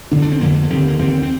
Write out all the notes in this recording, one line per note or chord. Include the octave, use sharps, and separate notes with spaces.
D2 D3 D4
D4
C4
F2 D3 A#3
G#3
A#3
D#2 D3 C4
A#3
D#2 D3 C4
C4